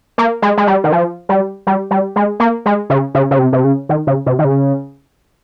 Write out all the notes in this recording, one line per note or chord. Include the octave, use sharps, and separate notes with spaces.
A#3
G#3
G#3
G3
D#3
F3
G3
G3
G3
G#3
A#3
G#3
C#3
C#3
C#3
C3
C3
C#3
D#3
C#3
C3
D#3
C#3